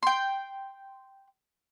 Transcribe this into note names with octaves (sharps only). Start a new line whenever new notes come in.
G5 C6